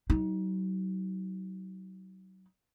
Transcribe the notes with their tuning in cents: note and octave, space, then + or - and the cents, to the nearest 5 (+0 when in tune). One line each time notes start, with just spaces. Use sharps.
F#3 +30 D#4 +25